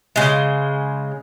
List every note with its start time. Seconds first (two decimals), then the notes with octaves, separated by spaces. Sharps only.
0.16 C#3 G#3